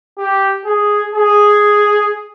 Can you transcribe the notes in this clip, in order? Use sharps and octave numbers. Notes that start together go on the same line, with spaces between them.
G4
G#4
G#4